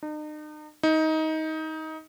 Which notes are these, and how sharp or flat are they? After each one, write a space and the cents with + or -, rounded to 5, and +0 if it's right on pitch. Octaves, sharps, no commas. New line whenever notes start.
D#4 -40
D#4 +20